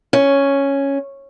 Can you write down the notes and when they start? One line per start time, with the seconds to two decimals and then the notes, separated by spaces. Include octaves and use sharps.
0.13 C#4